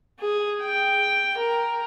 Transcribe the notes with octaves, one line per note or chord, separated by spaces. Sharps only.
G#4
G5
A#4